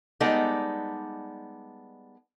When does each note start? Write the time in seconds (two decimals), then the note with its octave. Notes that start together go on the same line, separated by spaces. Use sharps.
0.20 G3 G#3 B3 D#4 A4 D5